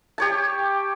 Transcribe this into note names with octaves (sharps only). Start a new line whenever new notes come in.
G4 C#5 A5